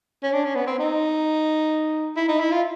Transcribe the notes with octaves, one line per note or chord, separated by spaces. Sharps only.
C#4
D4
C#4
B3
C4
D#4
E4
D#4
E4
F4